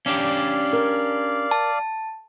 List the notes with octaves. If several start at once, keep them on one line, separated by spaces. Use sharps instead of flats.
C#4 D4 G4 D5 F5
A#4
A5